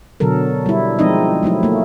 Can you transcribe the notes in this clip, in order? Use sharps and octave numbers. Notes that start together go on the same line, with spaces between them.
B2 D3 F#3 A4 A#4
G3 E4
F3 G#3 C4 D#4 D#5
F#3 A3 D#4 E4
A3 A#3